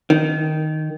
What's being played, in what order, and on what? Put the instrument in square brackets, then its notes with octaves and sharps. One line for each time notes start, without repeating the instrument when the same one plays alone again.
[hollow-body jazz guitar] D#3